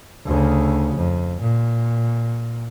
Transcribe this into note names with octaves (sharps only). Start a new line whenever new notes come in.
D2 C#3
F2
A#2